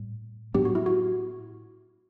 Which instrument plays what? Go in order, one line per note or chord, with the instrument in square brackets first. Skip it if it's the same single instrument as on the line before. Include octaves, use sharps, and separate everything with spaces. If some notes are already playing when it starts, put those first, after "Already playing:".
Already playing: [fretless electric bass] A2 G3
[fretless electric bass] A2 F#3 B3 D4 [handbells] G4
[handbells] F#4
E4
F#4